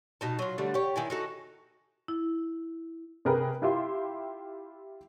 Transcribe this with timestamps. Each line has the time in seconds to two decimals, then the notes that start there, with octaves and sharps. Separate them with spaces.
0.21 B2 D#4 A5
0.39 F#3 F4
0.58 D3 G3 A3
0.74 G4 C#5
0.96 D#3 E4 G#5
1.10 D#4 F#4 A4
2.08 E4
3.25 C3 G#4 A#4 B4 G5
3.62 E4 F4 G4 E5 G5 C6